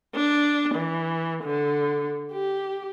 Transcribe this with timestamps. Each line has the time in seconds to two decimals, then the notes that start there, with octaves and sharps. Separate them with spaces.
0.15 D4
0.75 E3
1.44 D3
2.32 G4